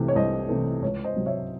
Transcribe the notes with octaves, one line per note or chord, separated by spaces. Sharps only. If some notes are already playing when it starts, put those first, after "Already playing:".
Already playing: C2 C3 E3 A3
C#5
C2 C5 D#5
C3 E3 A3
C#2 C#5
C5 D#5
C3 F#3
C#5 E5